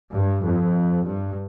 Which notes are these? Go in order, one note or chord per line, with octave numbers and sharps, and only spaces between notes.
G2
F2
G2